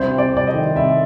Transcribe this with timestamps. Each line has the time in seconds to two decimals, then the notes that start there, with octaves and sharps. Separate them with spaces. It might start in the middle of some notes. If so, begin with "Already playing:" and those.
Already playing: C2 C5
0.11 C3
0.18 D5
0.33 C2 D5
0.47 D#5
0.54 D#3
0.75 C2 E5